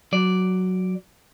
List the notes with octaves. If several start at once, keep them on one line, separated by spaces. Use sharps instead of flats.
F#3 D5